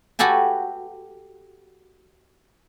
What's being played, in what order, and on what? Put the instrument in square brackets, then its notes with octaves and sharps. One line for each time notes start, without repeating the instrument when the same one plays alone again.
[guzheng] F#4 G4 A4 B4 G#5